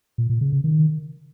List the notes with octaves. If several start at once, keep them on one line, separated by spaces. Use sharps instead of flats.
A#2
A#2
C#3
C#3
D#3